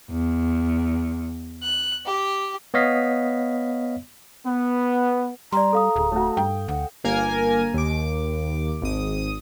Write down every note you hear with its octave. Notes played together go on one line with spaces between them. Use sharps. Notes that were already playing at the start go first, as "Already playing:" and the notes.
E2
F#6
G4
B3 C#5 D#5 F5 B6
B3
G3 D5 A#5 C6
A4 F5 D#6
D1 G#4
A3 F#4
G2 G5
D2 F#5
G1 A#3 A#4 G#5
D#2 D6
G#1 D#6